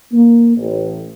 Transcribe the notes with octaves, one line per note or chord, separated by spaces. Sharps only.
A#3
A1